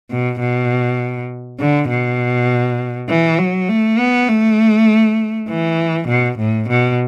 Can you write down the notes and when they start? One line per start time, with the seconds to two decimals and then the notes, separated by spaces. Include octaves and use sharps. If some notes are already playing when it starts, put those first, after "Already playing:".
0.11 B2
0.40 B2
1.60 D3
1.90 B2
3.09 E3
3.39 F#3
3.69 A3
3.99 B3
4.29 A3
5.49 E3
6.08 B2
6.39 A2
6.69 B2